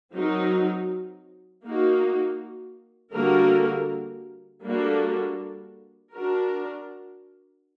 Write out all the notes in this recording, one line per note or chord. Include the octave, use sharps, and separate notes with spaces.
F#3 C4 D#4 F#4 A#4
A#3 D#4 F#4
D3 G3 A#3 F#4 A#4
G3 A#3 D4 F#4 A4
D4 F#4 A#4